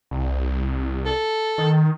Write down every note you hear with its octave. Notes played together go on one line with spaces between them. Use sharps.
C2
A4
D#3